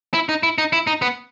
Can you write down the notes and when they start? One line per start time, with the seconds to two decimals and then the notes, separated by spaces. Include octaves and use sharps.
0.14 E4
0.29 D#4
0.43 E4
0.58 D#4
0.73 E4
0.87 D#4
1.02 B3